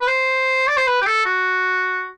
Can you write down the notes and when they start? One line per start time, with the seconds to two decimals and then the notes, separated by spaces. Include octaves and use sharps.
0.01 B4
0.07 C5
0.68 D5
0.77 C5
0.87 B4
1.02 G4
1.06 A4
1.26 F#4